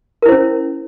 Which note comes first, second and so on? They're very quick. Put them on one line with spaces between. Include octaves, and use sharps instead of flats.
A#4 E4 C5 C#4